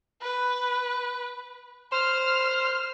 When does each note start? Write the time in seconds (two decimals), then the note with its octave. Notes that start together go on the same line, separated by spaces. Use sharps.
0.22 B4
1.92 C5 F6